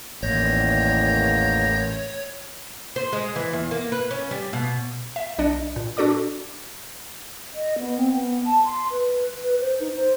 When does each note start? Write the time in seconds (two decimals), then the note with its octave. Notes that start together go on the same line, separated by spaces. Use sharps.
0.23 A1 E2 D#3 A#3 C#5 G6 A#6
2.96 C5
3.13 G#3
3.36 E3
3.53 E2
3.71 A#3
3.92 B4
4.11 C#4
4.31 G3
4.53 B2
5.16 E5
5.39 B1 D4 D5 D#5 C#7
5.76 A#2
5.97 D4 F#4 A4 D5 D6
7.53 D#5
7.78 B3
7.97 C4
8.13 B3
8.46 A5
8.65 C6
8.91 B4
9.43 B4
9.60 C5
9.80 D#4
9.95 C5